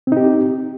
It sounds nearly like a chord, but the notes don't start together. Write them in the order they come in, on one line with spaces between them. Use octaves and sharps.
C4 D#4 G4